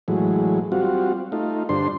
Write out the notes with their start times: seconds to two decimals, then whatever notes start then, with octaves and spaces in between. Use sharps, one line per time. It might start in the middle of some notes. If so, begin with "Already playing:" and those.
0.08 A2 E3 F#3 G#3
0.72 G3 C4 F4 F#4
1.32 A3 D#4 F4
1.69 G2 D3 D4 C5 C6